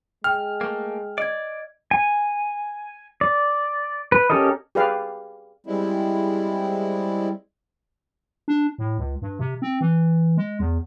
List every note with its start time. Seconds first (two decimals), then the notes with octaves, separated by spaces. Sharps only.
0.24 G#3 G5 F6
0.61 A3 A#3
1.18 D5 D#5 G#6
1.91 G#5
3.21 D5
4.12 B4
4.30 C#4 G4 A4 A#4 D#5
4.75 G4 G#4 B4 D5 F5
5.66 G3 G#3 C4 E4
8.48 D4
8.78 A2
8.98 C#2
9.22 G2
9.39 C3
9.62 C4
9.81 E3
10.37 G#3
10.60 E2